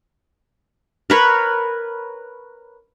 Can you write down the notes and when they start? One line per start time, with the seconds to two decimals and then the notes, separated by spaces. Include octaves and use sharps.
1.10 A#4 B4 C#5